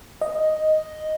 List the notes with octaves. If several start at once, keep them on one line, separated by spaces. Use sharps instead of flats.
D#5